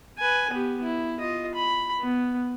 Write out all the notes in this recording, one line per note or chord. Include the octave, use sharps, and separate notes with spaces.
B4 G#5
B3 G4
E4
F4 D#5
B5
B3